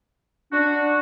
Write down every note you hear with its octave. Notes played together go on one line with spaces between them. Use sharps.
D4 F#4